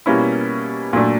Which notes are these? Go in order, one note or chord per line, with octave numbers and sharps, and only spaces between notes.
B2 G3 A#3 C#4 E4
A#2 F#3 A3 D4